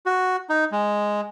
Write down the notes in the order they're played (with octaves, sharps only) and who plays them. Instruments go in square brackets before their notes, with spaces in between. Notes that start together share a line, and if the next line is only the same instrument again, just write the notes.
[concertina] F#4
D#4
G#3